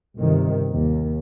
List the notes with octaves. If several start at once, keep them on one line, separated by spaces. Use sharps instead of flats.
G1 C3 D#3
D#2